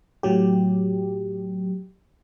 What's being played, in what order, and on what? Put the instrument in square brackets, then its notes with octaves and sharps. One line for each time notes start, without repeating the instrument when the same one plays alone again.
[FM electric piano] A2 F#3 G4